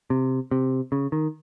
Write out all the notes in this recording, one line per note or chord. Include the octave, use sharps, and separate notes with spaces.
C3
C3
C#3
D#3